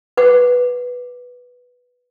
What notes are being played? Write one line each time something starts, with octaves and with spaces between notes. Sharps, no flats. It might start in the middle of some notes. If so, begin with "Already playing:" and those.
B4 F#5 D6